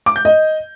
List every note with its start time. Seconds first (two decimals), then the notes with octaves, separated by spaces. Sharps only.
0.06 D6
0.16 G6
0.25 D#5